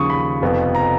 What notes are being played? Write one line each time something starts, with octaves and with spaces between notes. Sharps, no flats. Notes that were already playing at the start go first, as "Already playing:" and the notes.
Already playing: D#2 C#3 F3 C#6 D#6
B5
F1 F2 F3 B3
A#5